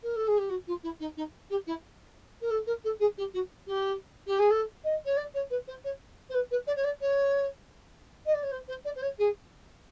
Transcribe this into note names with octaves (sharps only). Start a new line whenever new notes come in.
A#4
A4
G#4
G4
F#4
F4
E4
D#4
D#4
G4
E4
A#4
A4
A#4
A4
G#4
G4
F#4
G4
G4
G#4
A4
D#5
C#5
D5
C#5
B4
C5
C#5
C5
B4
B4
D5
C#5
D5
C#5
D#5
D5
C#5
C5
C5
D5
C5
C#5
G#4